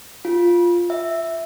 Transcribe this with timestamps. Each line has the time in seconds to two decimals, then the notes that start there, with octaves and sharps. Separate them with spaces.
0.25 F4
0.90 E5